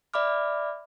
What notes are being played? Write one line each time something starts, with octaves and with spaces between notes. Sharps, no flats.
D5 E5 B5 D6 F6